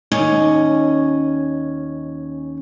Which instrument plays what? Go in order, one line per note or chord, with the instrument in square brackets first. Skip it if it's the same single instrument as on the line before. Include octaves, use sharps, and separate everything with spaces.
[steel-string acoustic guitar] D#2 C#4 D#5